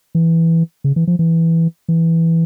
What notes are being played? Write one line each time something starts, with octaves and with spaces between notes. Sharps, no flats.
E3
C#3
E3
F3
E3
E3